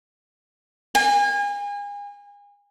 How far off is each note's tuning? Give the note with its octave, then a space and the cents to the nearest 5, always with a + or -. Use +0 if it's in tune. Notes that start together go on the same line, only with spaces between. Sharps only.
G#5 -35